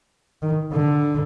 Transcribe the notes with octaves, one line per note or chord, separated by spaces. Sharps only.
D#3
D3